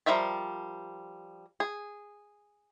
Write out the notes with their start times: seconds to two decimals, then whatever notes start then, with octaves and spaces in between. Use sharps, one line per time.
0.06 F3 G3 A#4 E5 A5
1.60 G#4